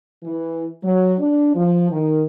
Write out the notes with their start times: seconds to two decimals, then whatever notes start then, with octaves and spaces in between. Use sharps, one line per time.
0.24 E3
0.83 F#3
1.19 D4
1.55 F3
1.90 D#3